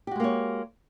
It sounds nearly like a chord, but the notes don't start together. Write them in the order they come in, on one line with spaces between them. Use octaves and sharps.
G4 F#4 G#3 A#3 C#5